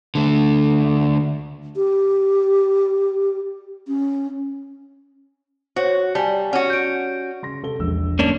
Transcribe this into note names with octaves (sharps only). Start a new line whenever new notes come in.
D3 A3
G4
C#4
F#4 C5 C#5
G3 G#5 A5
C#4 F#4 F#5
G6 D7
C#3 C6 A#6
C3 A4 G7
E1 A#1 E6
F#2 D3 A#3 C#4 D4